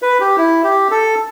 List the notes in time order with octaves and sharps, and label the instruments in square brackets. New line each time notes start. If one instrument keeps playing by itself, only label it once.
[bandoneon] B4
G4
E4
G4
A4